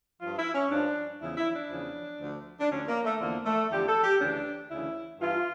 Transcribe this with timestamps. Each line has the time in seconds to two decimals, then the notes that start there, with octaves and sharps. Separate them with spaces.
0.20 G2 F3 F4
0.37 E4
0.55 C#4
0.70 G2 F3 D4
1.20 E2 C#3 F3 E4
1.37 E4
1.54 D4
1.70 E2 C#3 F3
2.20 D2 D3 F3
2.60 D4
2.70 D2 D3 F3 C#4
2.87 A#3
3.04 A3
3.20 E2 D3 F3 A#3
3.45 A3
3.70 E2 D3 F3 G4
3.88 A4
4.03 G4
4.20 D2 C#3 E3 D4
4.71 D2 C#3 E3 E4
5.20 G2 E3 F4